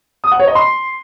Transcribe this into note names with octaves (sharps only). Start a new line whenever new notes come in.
D#6
F#5
C#5
D#5
C6